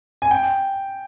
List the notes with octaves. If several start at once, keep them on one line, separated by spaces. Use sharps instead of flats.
G#5
G5